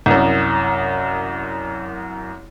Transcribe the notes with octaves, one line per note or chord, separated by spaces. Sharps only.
C2 F#2